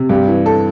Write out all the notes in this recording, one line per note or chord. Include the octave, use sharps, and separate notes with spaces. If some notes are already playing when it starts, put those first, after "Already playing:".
Already playing: C3
G2 G4
E3
A4